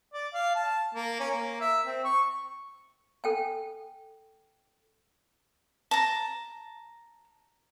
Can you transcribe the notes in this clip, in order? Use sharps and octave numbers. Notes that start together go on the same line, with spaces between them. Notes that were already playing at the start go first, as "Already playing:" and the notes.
D5
F5
A5
A#3
C#4
A#3
E5
C4
C#6
A4 G5 G#5
A5 A#5